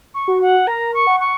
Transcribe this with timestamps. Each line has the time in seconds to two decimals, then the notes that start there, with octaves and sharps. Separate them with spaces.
0.14 C#6
0.28 F#4
0.41 F#5
0.67 A#4 A#5
0.94 C#6
1.07 F#5
1.20 C#6